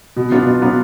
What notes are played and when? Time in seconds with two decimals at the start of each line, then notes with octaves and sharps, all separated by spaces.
0.17 B2
0.32 F#3 B3 D4 F4
0.46 B2
0.61 F#3 B3 D4 F4